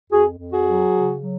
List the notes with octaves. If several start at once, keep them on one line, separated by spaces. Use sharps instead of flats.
F2 F#4 G#4
F2
F#4 G#4
F#3
C#3
F#3